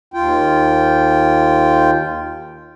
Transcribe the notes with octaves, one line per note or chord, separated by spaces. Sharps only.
D#2 F4 G5